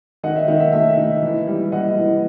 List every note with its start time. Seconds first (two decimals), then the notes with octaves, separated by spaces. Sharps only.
0.23 D#3 D#5 F#5
0.36 E5
0.48 D#3 D#5
0.60 E5
0.72 A3 E5
0.97 D#4
1.22 E3
1.47 G3
1.72 E3 D#5 F#5
1.97 E3